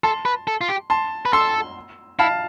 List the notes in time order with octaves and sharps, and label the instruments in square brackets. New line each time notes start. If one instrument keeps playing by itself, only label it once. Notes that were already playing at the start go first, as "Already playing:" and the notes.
[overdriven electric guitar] A4 [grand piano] A5 C6
[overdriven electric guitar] B4
A4
F4
G4
[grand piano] A5 C6
[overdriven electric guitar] B4
[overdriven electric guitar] A4 [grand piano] C6 E6
[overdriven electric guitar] E4 [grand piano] F5 A5